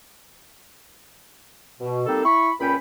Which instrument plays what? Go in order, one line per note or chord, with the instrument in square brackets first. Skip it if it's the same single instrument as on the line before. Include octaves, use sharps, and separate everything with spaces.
[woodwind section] B2
G3 A#3 C4 D#4 A4
E4 B5 C#6
C#2 A#2 C#4 G5 B5